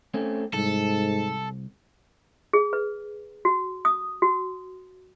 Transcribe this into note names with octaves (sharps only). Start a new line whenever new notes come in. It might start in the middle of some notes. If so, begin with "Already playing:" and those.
A3 C4 C#4
C2 G#2 A4
G#4
B4
F#4
D#6
F#4